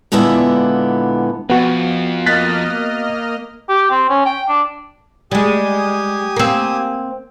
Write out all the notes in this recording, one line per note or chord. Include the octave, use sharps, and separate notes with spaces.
A#2 D3 G#3 B3 E4 E5
F2 B3 F#4
A#3 D#5 F6 F#6 A6 B6
G4
C4
C#4
G5
D4
G3 G#3 G4 G#5 D#6
A#3 C4